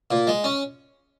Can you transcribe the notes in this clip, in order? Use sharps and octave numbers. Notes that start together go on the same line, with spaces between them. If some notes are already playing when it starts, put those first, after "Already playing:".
A#2
G#3
C#4